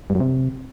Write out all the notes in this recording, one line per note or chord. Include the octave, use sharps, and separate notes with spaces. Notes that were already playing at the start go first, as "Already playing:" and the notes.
G2
F#2
C3